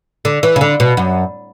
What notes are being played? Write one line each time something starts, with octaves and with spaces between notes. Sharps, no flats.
D3
E3
C#3
D3
B2
F#2